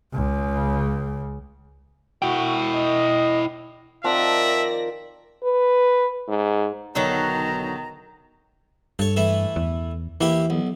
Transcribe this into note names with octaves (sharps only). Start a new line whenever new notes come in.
C#2 C#3
E4 F#4 G5
D#5
D#3 F3 C4 D5 E5 F#5 A5 A#6
B4
G#2
B1 D3 D#3 F#3 A4 A#5
G2 A4 C#5
E3 A3 E4
E2
E3 A#3 E4 G4
B1